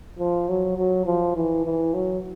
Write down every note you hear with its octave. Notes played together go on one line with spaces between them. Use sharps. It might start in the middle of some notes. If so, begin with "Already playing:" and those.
F3
F#3
F#3
F3
E3
E3
F#3